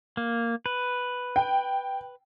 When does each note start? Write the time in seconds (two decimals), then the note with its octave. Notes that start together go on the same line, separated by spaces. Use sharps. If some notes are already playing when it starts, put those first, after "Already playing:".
0.17 A#3
0.66 B4
1.36 G5